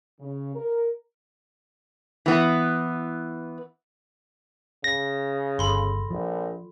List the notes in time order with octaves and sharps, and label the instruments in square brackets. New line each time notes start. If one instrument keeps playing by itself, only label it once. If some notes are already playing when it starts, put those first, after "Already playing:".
[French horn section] C#3
A#4
[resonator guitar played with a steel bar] E3 B3
[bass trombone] C#3 [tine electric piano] A#6
[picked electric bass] G1 [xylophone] A4 B5 C6
[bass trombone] A#1 [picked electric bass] F3